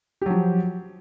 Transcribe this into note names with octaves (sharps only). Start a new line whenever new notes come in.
F3 F#3 G4